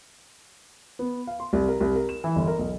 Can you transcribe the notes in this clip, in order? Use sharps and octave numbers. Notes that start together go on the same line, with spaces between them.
B3
F5
C6
C2
A#4
C2
A#4
E7
E3
G1
A#4
B1